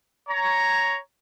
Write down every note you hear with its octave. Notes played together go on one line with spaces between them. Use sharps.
C#5 A#5